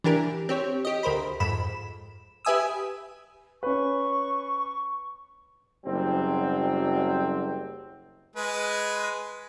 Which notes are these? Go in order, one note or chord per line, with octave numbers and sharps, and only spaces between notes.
E3 D4 G4 A#4
C4 G4 C#5
G4 D#5
D2 A#4 C5 B5
F2 G#2 B5 E7
G4 B4 E5 G#5 D#6 E6
C#4 B4 C#6
F#1 F#3 G3 C4
G#3 B4